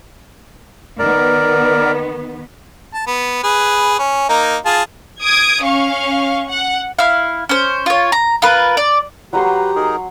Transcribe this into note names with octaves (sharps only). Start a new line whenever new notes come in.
D#3 B3 A#4 D5
A5
B3
G#4 B4
C#4
A#3 D#4
F4 G#4 A5
D#6 G#6 D7
C#4 F5 C#6
F#5
E4 F5
C#4 C5
F4 C#5
A#5
F4 A#4 B4
D5
F#3 G4 B4 F#5 A#5 C6
D#4 G#4 A#4